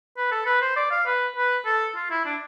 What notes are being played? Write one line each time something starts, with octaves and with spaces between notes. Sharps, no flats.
B4
A4
B4
C5
D5
F5
B4
B4
A4
F4
E4
D4